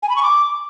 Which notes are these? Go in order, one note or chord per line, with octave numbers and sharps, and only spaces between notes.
G#5
B5
C#6
D6